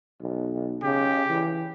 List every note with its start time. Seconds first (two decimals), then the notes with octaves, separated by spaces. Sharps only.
0.21 B1
0.83 C#3 G4
1.30 E3